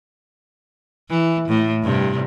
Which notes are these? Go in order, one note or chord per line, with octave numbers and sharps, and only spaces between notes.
E3
A2
G2 C3